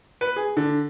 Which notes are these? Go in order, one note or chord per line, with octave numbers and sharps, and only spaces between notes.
B4
G#4
D3